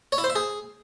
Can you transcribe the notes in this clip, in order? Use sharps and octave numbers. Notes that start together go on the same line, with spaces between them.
C#5
E4
C5
E5
G#4